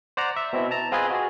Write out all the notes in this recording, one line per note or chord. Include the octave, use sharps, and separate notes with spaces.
C5 D5 F#5 A#5
E5
B2 C4 E4
A5 A#5
C4 F4 G#4 B4 D#5 G#5
F#4 G#4